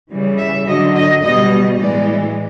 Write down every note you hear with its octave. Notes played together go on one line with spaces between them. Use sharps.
C#3 E3 G3
E5
D3 F#3 D#5
D#5
B2 G3 D#5
A2 E3 G#3 D5